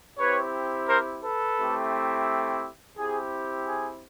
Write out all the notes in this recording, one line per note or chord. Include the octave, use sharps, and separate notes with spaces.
C4 E4 G4 B4 C#5
A#4 C5
A4 B4
A3 C4 E4 G4
C4 E4 G4 G#4
G#4